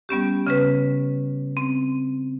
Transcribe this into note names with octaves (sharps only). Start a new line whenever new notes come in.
G3 B3 C#4 G4
C#3 C#4 B4
C4